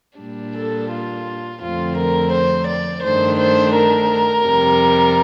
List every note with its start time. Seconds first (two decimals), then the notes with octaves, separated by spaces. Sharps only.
0.19 A#2 G3 D4
0.55 A4
0.91 F4
1.62 F2 D3 A3 C4 F4
1.98 A#4
2.33 C5
2.68 D5
3.04 G2 D#3 A3 D4 C5
3.39 C5
3.75 A#4
4.46 F2 C3 G3